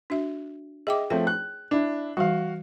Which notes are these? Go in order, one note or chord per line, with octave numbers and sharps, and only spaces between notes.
D4 F#4 E5
G#4 D#5 E5 G5 D6
F3 A3 C4 C#5 G5
F#6
D4 E4
E3 G3 F#4 F5